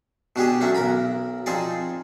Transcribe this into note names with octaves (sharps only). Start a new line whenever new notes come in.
B2 D4 G4 G#4
F#3 A3 C#4 D4
B1 A#4 A#5 B5
F3 C4 D#4 G#4 D5